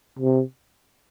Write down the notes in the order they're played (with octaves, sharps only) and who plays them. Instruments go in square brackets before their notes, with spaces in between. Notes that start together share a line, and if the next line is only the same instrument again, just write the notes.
[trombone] C3